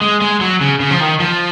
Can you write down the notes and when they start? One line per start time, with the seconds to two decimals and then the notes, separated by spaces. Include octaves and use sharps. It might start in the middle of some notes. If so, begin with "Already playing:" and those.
0.01 G#3
0.21 G#3
0.41 F#3
0.61 C#3
0.80 C#3
0.91 F3
1.00 D#3
1.20 F3